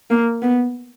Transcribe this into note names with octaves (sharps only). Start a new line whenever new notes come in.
A#3
B3